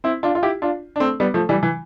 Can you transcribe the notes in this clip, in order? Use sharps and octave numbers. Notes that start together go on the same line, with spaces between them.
C4 E4
D4 F4
F4
E4 G4
D4 F4
D4
A3 C4
G3 B3
F3 A3
E3 G3
E3